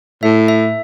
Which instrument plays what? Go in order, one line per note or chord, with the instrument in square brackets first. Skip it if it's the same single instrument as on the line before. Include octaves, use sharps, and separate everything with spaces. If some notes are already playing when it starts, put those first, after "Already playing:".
[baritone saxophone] A2 [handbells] E5
[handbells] E5